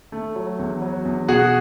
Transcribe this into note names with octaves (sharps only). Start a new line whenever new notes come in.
A3
F#3
E2
F#3
E2
B2 F#4 G#4